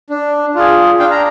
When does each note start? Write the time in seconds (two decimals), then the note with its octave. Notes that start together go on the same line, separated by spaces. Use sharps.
0.10 D4
0.55 F4 G#4
0.99 D4 F5 G5
1.11 A#5